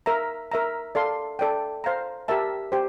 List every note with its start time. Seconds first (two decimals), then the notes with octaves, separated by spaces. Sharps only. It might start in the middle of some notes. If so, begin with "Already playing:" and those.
0.06 A#4 E5 A#5
0.52 A#4 E5 A#5
0.95 A4 D5 F5 C6
1.39 A4 D5 G5
1.84 C5 F5 A#5
2.28 G4 A#4 E5 A5
2.72 G4 C5 G5